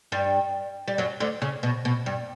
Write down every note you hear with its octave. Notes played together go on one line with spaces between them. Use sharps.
G2 G3
G3
F#2 F#3
D2 D3
C#3
B2
B2
G2